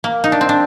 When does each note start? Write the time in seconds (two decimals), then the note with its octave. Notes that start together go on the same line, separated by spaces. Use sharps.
0.04 A#3
0.24 D#4
0.32 D4
0.41 C4
0.49 D4